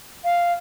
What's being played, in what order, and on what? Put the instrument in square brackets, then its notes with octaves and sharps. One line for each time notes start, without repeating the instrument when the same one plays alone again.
[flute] F5